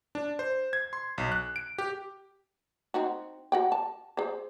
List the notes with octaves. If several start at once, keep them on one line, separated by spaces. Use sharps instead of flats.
D4
C5
G#6
C6
B1
F#6
D7
G4
C4 D#4 F#4
F#4 F#5 G5
A5
G#4 C5